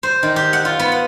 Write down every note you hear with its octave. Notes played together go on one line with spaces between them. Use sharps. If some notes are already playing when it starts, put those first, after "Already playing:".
C5
D#3
G4
F#5
F4
B3
F#5